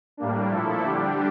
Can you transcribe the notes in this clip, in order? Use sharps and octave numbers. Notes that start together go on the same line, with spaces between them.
A2 G3 A#3 D4
A#2 F3 A3 E4 A4
D3 G3 D4 G4